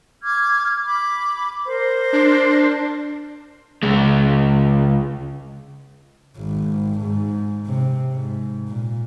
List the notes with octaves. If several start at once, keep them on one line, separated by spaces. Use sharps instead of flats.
D6 F6 G#6
B5 D6
A#4 C5
D4
C#2 G#3
G#1
G#2
C3
G#2
A#2